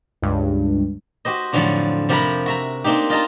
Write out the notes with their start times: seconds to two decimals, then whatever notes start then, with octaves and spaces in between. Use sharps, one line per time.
0.22 C#2 G2
1.25 F#4 G4 C5 D#5
1.53 F2 A2 D3 F3 F#3 D4
2.09 C3 F3 G4 A#4 A#5 B5
2.46 F#4 E5 A#5
2.84 A#3 C4 D4 D#4 G4
3.10 F4 D#5 A5 A#5